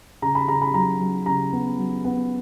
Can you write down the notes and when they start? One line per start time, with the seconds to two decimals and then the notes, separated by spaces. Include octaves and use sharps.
0.22 C#3 A#5
0.35 B5
0.48 C#3 A#5
0.62 B5
0.74 F#3 A#5
1.00 F#3
1.26 C#3 A#5
1.52 B3
1.78 F#3
2.04 B3